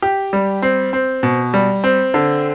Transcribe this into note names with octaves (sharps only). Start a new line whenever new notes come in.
G4
G3
C4
C4
B2
G3
C4
D3